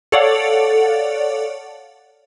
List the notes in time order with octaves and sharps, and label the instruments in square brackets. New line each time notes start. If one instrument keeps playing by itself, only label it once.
[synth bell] A4 C#5 D5 F5 F#5